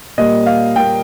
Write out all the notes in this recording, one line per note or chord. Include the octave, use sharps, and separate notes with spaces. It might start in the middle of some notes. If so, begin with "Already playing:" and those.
A#2 G3 A#3 D#5
F5
A#2 G3 A#3 G5